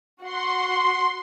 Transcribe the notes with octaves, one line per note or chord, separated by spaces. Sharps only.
F#4 F#5 C6